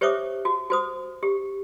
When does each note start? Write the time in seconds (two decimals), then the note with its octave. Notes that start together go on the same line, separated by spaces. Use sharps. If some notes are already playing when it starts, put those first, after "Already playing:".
0.01 G4 C5 C#5 E5 D6 D#6
0.45 F#4
0.70 F#4 C5 D#6
1.23 G4